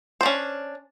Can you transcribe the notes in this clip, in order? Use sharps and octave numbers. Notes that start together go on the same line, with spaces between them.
C#4 D4 C5